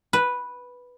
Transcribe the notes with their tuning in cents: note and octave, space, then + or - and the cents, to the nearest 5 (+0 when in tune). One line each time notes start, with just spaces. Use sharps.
B4 -5